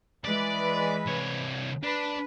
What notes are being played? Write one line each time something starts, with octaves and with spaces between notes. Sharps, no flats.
E3 G#3 B4 D5
C2 C#5
D4 B4